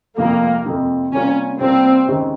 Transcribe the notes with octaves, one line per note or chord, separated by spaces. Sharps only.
F2 C3 F3 A#3 C4
F2 C3 F3 C4
C3 G3 A#3 C#4 F4
C3 G3 A#3 C4 F4
D#2 C#3 G#3 D#4